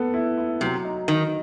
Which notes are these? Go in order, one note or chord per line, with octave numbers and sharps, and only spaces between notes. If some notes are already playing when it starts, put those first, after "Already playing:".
Already playing: B3 A4
E4
E4
C3 F#3
D#4
D#3 D#4